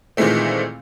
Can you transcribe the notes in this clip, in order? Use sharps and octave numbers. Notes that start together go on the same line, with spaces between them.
A#2 D#3 E3 G#3 A3 C4